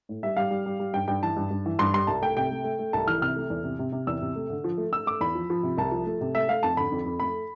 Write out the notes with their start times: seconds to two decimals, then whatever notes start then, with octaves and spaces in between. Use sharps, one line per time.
0.09 A2
0.23 G3 E5
0.36 G3 F5
0.51 G3
0.66 G3
0.80 G3
0.94 G2 G5
1.08 G2 G5
1.22 E3 A5
1.36 G2
1.51 G2
1.66 E3
1.79 G2 C6
1.94 G3 C6
2.07 C2 A5
2.22 A3 G5
2.37 C3 G5
2.50 A3
2.64 A3
2.79 A3
2.93 C2 A5
3.07 E3 F6
3.22 C3 F6
3.36 A3
3.50 E2
3.64 C3
3.79 C3
3.92 C3
4.07 E2 E6
4.22 C3
4.36 A3
4.50 D3
4.64 F3
4.78 A3
4.92 A3 E6
5.06 A3 D6
5.20 E2 B5
5.35 F3
5.50 F3
5.63 C3
5.78 C2 A5
5.91 F3
6.06 A3
6.21 C3
6.35 A3 E5
6.48 A3 F5
6.63 F2 A5
6.77 D3 B5
6.92 F2
7.05 F2
7.20 A3 B5